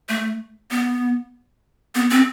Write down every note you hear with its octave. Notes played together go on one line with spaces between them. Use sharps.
A3
B3
B3
C4